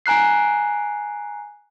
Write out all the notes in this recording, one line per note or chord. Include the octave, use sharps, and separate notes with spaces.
G#5 A#5 F#6 C7